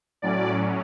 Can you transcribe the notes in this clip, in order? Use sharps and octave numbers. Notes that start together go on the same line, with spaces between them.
A2 F#3 C#4 D5